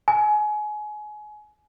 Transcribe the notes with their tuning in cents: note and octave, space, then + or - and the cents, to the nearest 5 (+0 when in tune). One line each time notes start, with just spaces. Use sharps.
G#5 +25